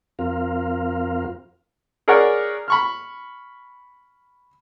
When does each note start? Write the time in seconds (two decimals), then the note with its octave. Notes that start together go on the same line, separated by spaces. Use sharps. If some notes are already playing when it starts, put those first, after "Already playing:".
0.19 F2 C4 F4 A#4 F5
2.08 G#4 A#4 C#5 D5 F#5
2.68 B5 C#6 F6